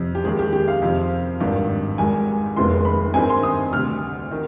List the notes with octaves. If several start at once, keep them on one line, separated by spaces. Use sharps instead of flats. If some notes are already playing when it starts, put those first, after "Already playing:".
Already playing: F2 C3 F3 C4
G4
D#2 D#3 G#3 G#4
G4
G4
F5
F2 C3 F3 C4
G#1 G2 D#3
G#1 G#2 D#3 G3 G#5
F1 D#2 D#3 G#3 B3 C6
B5
G2 D#3 G3 C4 D#4 G#5
C6
D#6
D2 C3 G3 F6
D#3